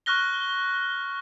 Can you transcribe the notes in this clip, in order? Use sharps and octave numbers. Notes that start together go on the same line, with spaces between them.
C#6 F6 F#6 A#6 G7